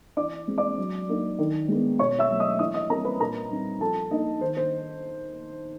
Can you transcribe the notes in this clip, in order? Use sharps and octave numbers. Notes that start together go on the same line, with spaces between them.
E3 D5 D6
G#3 C4
D5 D6
F#3
A#3 D#4
D#3
G#3 B3
B2 C#5 C#6
E5 E6
F#3 A3
D#5 D#6
E3 D#5 D#6
D#5 D#6
G3 C4 A#4 A#5
B4 B5
A#2 A#4 A#5
G3 C4 D#4
F3 A4 A5
A#3 D#4 D#5
D#3 C5
C5